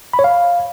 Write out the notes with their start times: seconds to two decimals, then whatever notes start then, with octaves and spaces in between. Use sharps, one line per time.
0.13 B5
0.19 C#5
0.24 F5